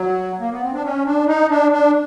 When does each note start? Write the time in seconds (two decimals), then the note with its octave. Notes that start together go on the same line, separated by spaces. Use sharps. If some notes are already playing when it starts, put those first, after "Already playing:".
Already playing: F#3
0.40 A#3
0.52 B3
0.62 C4
0.73 D4
0.84 C#4
1.05 D4
1.27 D#4
1.49 D4
1.72 D4